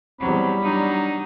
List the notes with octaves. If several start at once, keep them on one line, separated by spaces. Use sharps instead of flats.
E2 F#3 G3 C4 B5
F#3 D4 D#4